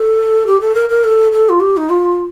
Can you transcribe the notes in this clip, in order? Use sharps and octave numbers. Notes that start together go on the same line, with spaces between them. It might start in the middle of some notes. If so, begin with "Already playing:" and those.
Already playing: A4
G4
A4
A#4
A#4
A4
A4
F4
G4
D#4
F4